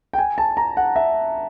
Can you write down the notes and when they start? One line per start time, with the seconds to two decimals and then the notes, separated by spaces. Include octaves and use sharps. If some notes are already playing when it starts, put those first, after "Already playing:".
0.13 G5
0.18 G#5
0.38 A5
0.57 A#5
0.77 F#5
0.96 E5